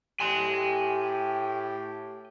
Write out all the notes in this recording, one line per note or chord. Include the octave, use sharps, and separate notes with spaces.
A2 G4 G#5 C6